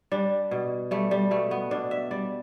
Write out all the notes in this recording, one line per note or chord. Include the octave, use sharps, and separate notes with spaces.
G3 D4
B2
G3 A3
G3
B2 A3
B3
B2 D4
E5
G3 D5